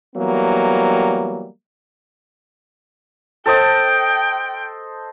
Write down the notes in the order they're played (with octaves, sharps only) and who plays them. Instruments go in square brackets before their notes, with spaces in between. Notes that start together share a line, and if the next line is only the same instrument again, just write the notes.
[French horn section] E3 F#3 G3 A#3 B3
[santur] A4 C5 D#5 [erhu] G5